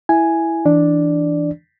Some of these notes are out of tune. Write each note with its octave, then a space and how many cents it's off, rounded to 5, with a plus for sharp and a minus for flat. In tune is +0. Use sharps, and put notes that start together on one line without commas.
E4 +0 G#5 +0
E3 +0 D4 +0 D5 +0